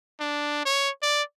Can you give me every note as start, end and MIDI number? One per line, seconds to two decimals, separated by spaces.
0.21 0.62 62
0.66 0.90 73
1.02 1.22 74